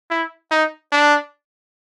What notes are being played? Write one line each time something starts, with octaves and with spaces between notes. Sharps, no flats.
E4
D#4
D4